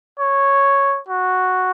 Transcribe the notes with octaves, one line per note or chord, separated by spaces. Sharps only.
C#5
F#4